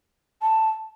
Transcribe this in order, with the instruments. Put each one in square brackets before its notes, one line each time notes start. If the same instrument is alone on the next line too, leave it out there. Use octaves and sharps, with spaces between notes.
[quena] A5